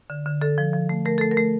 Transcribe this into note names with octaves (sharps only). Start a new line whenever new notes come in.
D3
D3
D3 A4
F3
F3
A3
A3 A#4
A3 A4
A#4
A3